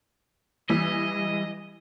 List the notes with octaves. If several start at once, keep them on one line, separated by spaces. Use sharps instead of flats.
E3 G3 D#5